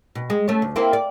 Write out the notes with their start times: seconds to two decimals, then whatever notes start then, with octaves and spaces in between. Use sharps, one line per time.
0.15 B2
0.30 G#3
0.48 A3 C#4 C#5
0.62 D2
0.76 A#3 C4 E4
0.93 D5